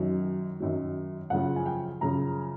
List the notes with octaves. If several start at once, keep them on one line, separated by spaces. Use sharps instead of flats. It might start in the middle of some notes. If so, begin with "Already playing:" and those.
Already playing: F#2 D#3 F#3
F#2 D#3 F#3
F#2 C#3 F3 F#5
G#5
G5
F#2 C#3 F3 A#5